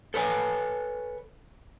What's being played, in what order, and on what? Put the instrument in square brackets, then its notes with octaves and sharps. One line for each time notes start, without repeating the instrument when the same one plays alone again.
[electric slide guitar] A4 B4 C#5 G#5